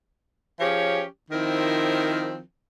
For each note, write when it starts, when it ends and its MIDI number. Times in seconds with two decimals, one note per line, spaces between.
0.60 1.03 53
0.60 1.03 61
0.60 1.03 67
0.60 1.03 68
0.60 1.03 73
1.31 2.39 51
1.31 2.39 53
1.31 2.39 60
1.31 2.39 64
1.31 2.39 70